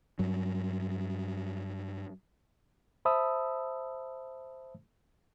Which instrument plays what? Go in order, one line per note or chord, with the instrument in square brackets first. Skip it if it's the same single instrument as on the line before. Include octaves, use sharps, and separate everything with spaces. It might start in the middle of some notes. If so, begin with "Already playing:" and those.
[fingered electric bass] G2 F#3
[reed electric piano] C5 E5 A5 B5 D#6 E6